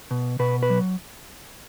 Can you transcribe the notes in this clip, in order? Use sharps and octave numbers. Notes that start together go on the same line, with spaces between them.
B2
B2 B4
B4
F#3